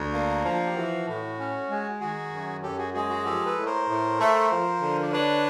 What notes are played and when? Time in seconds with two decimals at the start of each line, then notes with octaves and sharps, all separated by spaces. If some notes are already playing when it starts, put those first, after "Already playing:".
Already playing: D2
0.13 A#3 D4
0.45 F3
0.66 G4
0.75 E3 F#4
1.07 A2
1.38 C#4
1.69 G#3
2.01 D#3 F#4 G#4
2.31 F#2
2.63 F#2 G4 A4
2.78 F#4 G#4
2.94 G#3 F#4 G#4
3.09 F#4 G#4
3.25 F3 G4 A4
3.46 A4 B4
3.57 A2
3.66 A#4 C5
3.88 A2
4.19 A3
4.50 F3
4.81 D3
5.03 D5
5.12 D4 B4 C#5